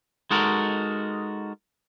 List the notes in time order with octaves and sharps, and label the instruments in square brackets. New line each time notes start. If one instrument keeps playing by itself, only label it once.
[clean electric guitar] G#3 D#4 F#4 A4 A#4